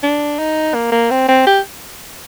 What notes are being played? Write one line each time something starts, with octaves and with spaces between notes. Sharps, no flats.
D4
D#4
A#3
A#3
C4
C4
G4